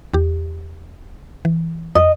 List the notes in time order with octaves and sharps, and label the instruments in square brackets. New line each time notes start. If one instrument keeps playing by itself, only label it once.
[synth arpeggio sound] E2 G4
E3
[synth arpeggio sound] F2 [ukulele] D#5